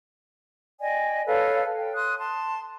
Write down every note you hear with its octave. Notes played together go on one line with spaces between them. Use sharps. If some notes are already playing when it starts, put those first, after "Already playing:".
D5 D#5 G5 G#5
A4 B4 C#5 F5
G5
C6 D#6 F#6
A5 C6